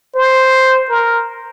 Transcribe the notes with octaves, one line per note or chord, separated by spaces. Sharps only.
C5
A#4